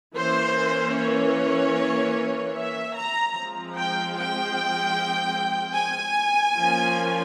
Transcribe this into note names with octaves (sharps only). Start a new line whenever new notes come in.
E3 A#3 C#4 C5
C#5
E5
A#5
F3 G#3 C4
G5
G5
G#5
F3 A#3 C#4